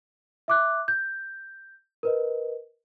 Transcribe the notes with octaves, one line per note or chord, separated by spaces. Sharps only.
E5 D6 F#6
G6
A#4 B4 D#5